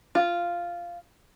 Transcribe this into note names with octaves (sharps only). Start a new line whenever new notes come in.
F4